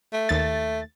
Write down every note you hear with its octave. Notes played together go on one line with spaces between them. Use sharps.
A3
D#2 A6